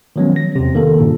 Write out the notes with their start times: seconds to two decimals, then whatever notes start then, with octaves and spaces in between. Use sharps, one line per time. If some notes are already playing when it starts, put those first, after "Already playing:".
0.16 D#3 F3 F#3 G#3 B3 C#4
0.36 A#6
0.55 E2 C3
0.75 D#3 A#3 A4
1.00 G2 A#2 C#3